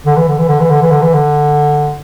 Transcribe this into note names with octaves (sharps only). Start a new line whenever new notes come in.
D3
E3
D3
E3
D3
E3
D3
E3
D3
E3
D3